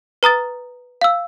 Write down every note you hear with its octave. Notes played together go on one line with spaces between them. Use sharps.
B4 A#5 D#6 A6
F5 E6